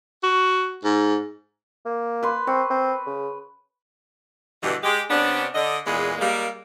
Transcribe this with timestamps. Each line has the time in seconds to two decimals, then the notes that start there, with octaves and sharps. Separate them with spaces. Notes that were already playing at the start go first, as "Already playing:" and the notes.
0.23 F#4
0.85 G#2
1.86 A#3
2.23 B4 C6
2.47 C4 C#6
2.70 C4
3.06 C#3
4.63 G2 B2 D3 E3
4.83 G#3 G4
5.10 C3 B3 C#4 D4
5.54 D3 D#5
5.86 E2 A#2 G#3 G#4 B4
6.19 G3 G#3 A#3